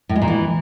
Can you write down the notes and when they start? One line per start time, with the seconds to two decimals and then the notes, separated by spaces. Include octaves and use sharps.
0.09 A2
0.15 G#3
0.22 A#2
0.28 E3